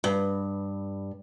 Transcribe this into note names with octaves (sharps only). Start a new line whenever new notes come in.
G2